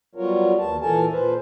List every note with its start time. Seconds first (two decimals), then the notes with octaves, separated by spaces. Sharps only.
0.15 F#3 G3 B3 F4 A#4 C#5
0.58 D#2 A5
0.81 A#2 E3 A4 A#4 G#5 A5
1.10 A#2 B4 C5